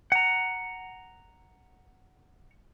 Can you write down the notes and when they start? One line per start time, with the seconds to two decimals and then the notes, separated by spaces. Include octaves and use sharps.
0.12 F#5 A#5